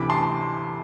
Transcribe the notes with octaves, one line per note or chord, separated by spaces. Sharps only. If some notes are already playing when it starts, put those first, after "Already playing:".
Already playing: D2 C3 E3 B5 D6
A5 C6